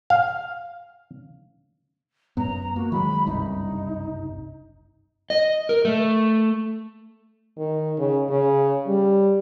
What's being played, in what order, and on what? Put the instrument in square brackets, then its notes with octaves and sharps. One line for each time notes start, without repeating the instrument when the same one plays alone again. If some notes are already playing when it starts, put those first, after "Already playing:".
[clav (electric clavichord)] F5
[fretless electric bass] F#2 B3 [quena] A#5
[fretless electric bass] A#3 [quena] F#4
[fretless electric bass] D#3 F#3 G#3 [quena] B5
[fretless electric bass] F#1 C2 G2 [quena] D#4
[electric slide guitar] D#5
A#4
A3
[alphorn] D#3
C#3
C#3
G3